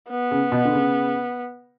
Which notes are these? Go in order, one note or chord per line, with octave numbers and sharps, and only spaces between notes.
B3
C#3
B2
D3
C#3